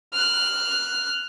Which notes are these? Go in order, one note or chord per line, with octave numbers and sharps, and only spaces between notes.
F6 F#6